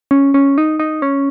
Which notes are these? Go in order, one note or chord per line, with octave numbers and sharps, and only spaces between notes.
C#4
C#4
D#4
D#4
C#4